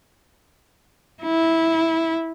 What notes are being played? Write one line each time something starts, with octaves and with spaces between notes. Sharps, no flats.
E4